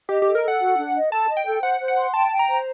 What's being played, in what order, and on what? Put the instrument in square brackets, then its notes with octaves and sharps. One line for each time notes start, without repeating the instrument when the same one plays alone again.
[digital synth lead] G4 [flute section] D#5
[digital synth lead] G4 [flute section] A4
[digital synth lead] A#4
[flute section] A4
[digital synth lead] F#5
[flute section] F#4
D4
D#5
[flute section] A4 [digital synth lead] A5
[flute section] D#5
[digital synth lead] G5
[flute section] A4
[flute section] C5 [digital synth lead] F#5
[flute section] C5
[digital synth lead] F#5
[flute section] C6
[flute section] G5 [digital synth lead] A5
[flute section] G5
[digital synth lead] A#5
[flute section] C5